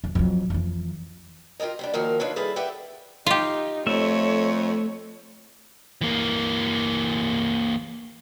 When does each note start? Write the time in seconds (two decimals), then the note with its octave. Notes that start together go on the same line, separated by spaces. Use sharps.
0.04 F2
0.15 F2 F#3
0.50 F2 E3
1.60 F4 G4 A4 A#4 D#5
1.79 G3 B3 D4
1.94 D#3 F3 F#3 A#3 A#4
2.20 D4 D#4 F4 A4 B4 C#5
2.36 G3 E4 G#4 A4 B4
2.56 G4 B4 E5 F#5 G5
3.26 D#4 F4 G4
3.87 F2 A3 C#5 E5
6.01 E3 A#3